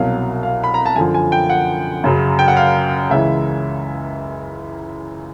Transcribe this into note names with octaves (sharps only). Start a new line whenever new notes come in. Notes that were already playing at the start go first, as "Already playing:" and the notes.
Already playing: C2 B2 F#3 F5
F5
B5
A#5
A5
F#2 D3 F3 G#5
G#5
G5
F#5
F#2 C#3 F#3
G5
F#5
F5
C#2 C#3 E3 E5